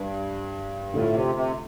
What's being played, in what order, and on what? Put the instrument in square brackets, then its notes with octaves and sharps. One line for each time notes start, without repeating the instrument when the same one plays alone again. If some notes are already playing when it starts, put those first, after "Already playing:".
Already playing: [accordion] G2
[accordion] A2 [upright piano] D3 A3 F4
[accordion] C3
C3